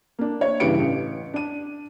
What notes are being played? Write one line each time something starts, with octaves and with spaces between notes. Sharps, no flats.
A#3 D4
C#5
G2 C#3 E3 G4 C#7 D7
A1
D4 D#7